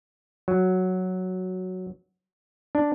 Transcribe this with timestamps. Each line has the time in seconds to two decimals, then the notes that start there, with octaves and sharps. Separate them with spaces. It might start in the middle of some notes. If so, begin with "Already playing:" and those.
0.48 F#3
2.75 D4